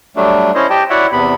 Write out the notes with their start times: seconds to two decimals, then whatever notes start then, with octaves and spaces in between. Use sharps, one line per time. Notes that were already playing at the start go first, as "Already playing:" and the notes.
0.16 F#3 G3 A3 D4
0.55 C#4 E4 C5 C#5 D#5
0.70 G4 D#5 G5 A5
0.90 E4 F#4 C#5 D5 E5 F#5
1.12 E2 C3 B3 B5